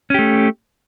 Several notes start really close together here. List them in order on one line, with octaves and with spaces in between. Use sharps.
C#4 G4 A3